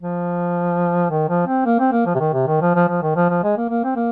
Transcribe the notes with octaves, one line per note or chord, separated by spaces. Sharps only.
F3
D#3
F3
C4
A#3
C4
A#3
F3
C3
D#3
C3
D#3
F3
F3
F3
D#3
F3
F3
G#3
A#3
A#3
C4
A#3